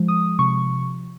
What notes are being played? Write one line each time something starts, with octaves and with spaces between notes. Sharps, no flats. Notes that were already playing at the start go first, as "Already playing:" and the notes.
Already playing: F3 G#3
D#6
C3 C#6